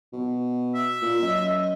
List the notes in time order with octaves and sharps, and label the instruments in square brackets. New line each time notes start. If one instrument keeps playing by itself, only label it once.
[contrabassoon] B2
[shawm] E5
[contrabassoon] A#2
[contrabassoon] F#2 [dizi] D#5